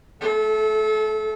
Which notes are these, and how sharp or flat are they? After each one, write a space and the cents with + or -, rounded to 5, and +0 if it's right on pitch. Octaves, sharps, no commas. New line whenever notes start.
A3 +0 A4 -30